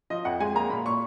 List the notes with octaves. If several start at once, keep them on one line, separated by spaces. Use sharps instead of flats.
F3 D#5
F2 F#5
G#3 G#5
A#3 A#5
A#2 B5
A#2 C#6